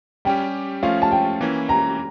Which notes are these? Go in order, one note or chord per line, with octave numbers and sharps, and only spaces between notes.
G3 C#4 G4 G5
F3 A3 C#4 F4 F5
A5
G5
E3 A#3 C#4 E4
A#5